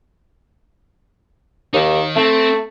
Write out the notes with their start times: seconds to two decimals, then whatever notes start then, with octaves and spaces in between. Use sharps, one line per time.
1.73 D#2 D#3 D#4
2.16 A3 C4